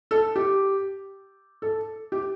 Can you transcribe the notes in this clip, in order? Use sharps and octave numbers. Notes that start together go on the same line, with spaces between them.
A4
G4
A4
G4